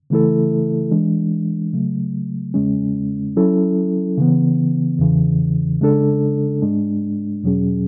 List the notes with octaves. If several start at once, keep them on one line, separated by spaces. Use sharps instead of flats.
C#3 E3 A3 E4 A4
E3 G#3 D4
C#3 F#3 A3
E2 C#3 G#3 C#4
F#3 C#4 E4 A4
C#3 E3 B3
E2 C#3 E3
C#3 G#3 D4 A4
G#2 G#3 D4
E2 B2 F#3 C#4 G#4